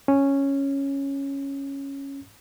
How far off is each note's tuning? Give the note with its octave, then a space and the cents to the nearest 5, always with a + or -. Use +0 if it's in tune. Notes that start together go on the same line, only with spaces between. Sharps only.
C#4 -5